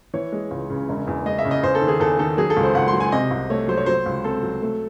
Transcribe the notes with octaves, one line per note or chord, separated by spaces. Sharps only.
E3 C#5
G#3
C#2
C#3
E1
E2
G#3 D#5
E5
C#3
D#5
E2 C5
A4
D#3
G#4
E2 A4
D#3 A4
F#3 G#4
A4
C#2
C5
C#2 F#5
C6
F#3
G#5
C3 D#5
C2
A3 C#5
F#3 C5
C#5
F#3 C5
C#2
C4 A4
F#3
A3